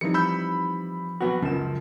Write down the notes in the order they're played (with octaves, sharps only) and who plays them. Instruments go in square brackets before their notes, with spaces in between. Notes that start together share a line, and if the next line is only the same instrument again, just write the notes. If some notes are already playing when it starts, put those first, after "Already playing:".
[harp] E3 F3 D#4 [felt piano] G3 C4 E4 [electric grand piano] C#7
[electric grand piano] B5 E6 G6
[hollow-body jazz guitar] F#3 B3 F#4
[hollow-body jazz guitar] C#2 [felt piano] F#2 F3 [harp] F4 E7